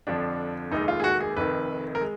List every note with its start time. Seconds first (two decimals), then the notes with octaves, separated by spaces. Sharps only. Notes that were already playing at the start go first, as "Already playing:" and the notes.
0.07 F2 D3 F3 D4
0.71 F1 D#2 D#3 G#3 D#4
0.88 F4
1.00 G#4
1.04 F#4
1.20 G#4
1.36 F1 F2 D#3 B4
1.95 A#4
2.01 G#3